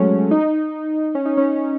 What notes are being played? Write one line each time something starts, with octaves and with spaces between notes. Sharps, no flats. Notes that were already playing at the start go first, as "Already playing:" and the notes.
Already playing: F#3 G#3 A3 C#4
D#4
C#4
D#4
C#4